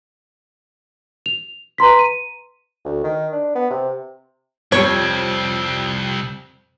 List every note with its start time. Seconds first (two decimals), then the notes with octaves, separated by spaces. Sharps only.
1.26 F7
1.78 B4 A#5 C6 B6
1.99 D#7
2.85 D2
3.04 D#3
3.32 D4
3.55 B3
3.70 C3
4.72 C2 F2 G3 C4 C#5